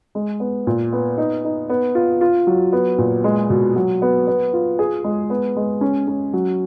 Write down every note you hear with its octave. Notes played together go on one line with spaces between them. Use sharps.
G#3
B3
A#2
B3
D#4
D#4
B3
F4
F4
F#3
B3
A#2
G#3
B2
F#3
B3
B3
F4
G#4
G#3
B3
G#3
C#4
C#4
F#3